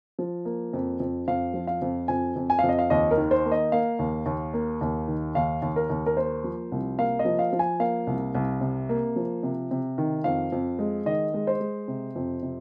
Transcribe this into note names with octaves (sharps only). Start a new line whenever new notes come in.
F3
A#3
F2
F2
F2 F5
F3
F5
F2
F2 G#5
F2
G#5
F5
F2
D#5
F5
D#2 D#5
A#4
D#3
C5
A#3
D#5
A#3 F5
D#2
D#2
A#3
D#2
D#3
D#2 F5
D#2
A#4
D#2
A#4
A#3 C5
F3
C2
A#3 F5
D#5
F3
F5
F3
G#5
A#3 F5
C2
C2
C3
A#3
F3
C3
C3
D#3
F2 F5
F2
G#3
D#3 D#5
G#3
C5
G#3
C3
F2
C3